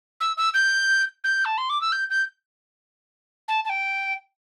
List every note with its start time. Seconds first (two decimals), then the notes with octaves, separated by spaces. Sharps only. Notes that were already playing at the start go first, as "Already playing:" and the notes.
0.21 E6
0.37 E6
0.54 G6
1.24 G6
1.45 A5
1.58 C6
1.70 D6
1.81 E6
1.92 G6
2.10 G6
3.48 A5
3.65 A5
3.70 G5